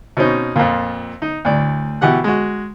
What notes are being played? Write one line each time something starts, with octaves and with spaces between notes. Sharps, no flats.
B2 C4 C#4 D#4
F2 A#2
D#4
D2 A2 D5
B2 E3 G4 F#5 F#6
G#3 F#4